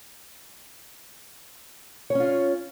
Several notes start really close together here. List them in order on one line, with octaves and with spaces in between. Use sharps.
C#5 C#4 F4